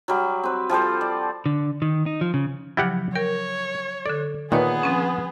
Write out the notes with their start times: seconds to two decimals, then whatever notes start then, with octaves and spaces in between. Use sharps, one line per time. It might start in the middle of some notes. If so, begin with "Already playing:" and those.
0.08 F#3 G3
0.44 C4 B4
0.70 F3 G3 A4 C5
1.01 D5
1.46 D3
1.82 D#3
2.06 D#4
2.21 F3
2.34 C#3
2.77 C#3 F3 F#3 E4 G4 F#5
3.16 A#4 C#5 G5
4.06 D3 A4 D5
4.52 A#2 D#3 B3 G#4 B4 C#5 F#6
4.83 F3 C4 C#4